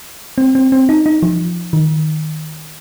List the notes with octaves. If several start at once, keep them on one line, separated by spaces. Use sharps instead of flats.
C4
C4
C4
D#4
D#4
F3
D#3